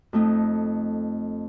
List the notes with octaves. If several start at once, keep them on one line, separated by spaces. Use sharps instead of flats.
F2 A3 D#4